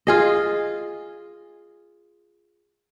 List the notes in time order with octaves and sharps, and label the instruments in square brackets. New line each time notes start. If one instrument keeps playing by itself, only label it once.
[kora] F4 G#4 D#5